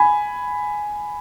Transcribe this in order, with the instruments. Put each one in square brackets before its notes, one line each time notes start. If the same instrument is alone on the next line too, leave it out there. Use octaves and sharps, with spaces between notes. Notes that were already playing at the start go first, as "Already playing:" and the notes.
Already playing: [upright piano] G#5 B5